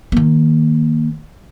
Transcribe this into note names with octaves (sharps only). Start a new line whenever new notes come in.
D#3 A#3